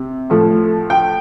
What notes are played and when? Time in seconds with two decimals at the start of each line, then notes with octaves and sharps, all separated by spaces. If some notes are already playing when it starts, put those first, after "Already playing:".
Already playing: C3
0.30 A2 F3 A3
0.90 G5